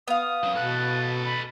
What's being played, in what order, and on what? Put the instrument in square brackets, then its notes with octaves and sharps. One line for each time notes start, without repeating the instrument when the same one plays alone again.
[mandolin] B3 F5 [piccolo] D#6
[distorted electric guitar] F#3 C#4
[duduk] B2 [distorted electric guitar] A4 B4 [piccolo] F#6
[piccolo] B5